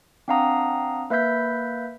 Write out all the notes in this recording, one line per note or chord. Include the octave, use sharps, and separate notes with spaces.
C4 D4 F5 F#5 A#5 D#6
A#3 B4 E5 B5 G6 B6